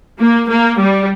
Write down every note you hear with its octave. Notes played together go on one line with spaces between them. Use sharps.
A#3
A#3
G3